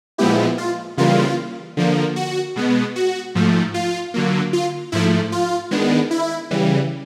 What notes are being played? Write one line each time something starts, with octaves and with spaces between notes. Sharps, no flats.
A#2 F3 G#3 B3 E4 G4
F4
C#3 E3 G3 A#3 F4
D3 F3 A#3
F#4
B2 G#3 B3
F#4
G#2 F3 A3
F4
D3 F#3 A#3
F4
G#2 F3 A3 E4
F4
D#3 G#3 B3 D4
E4
C#3 E3 G3